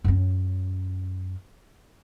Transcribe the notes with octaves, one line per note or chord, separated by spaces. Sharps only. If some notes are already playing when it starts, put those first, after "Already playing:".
F#2 C#4